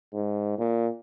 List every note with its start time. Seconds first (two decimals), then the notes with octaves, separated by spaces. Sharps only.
0.13 G#2
0.58 A#2